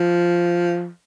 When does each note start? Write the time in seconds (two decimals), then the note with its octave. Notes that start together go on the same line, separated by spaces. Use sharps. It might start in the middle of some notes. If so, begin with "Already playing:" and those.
Already playing: F3